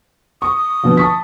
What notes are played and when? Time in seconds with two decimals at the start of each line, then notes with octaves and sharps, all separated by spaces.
0.42 C#6 D#6
0.83 B2 D3 F3
0.97 A5 C#6 B6